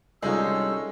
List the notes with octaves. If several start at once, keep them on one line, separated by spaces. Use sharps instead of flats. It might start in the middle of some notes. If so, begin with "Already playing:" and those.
C2 G3 G#3 C#4 D#4 F4 A4 E6